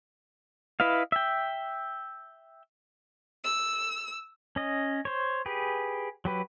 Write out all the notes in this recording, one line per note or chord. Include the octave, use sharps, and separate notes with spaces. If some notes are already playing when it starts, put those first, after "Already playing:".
E4 B4 D#5 F5
E5 G5
E6
C#4 D#5
C5 C#5
G4 G#4 B4
F#3 G4 B4